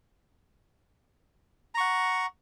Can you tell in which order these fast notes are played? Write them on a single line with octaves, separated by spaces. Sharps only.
A#5 C#6 F#5